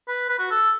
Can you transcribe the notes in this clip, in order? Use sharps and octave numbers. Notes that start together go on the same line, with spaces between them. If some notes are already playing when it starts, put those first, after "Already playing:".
B4
B4
F#4
A4